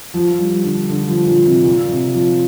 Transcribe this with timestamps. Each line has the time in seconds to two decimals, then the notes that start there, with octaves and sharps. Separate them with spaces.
0.14 F3
0.39 G3
0.64 D3
0.90 D3
1.08 F3
1.27 A#2
1.45 C3
1.64 A#2
1.89 C3
2.15 F3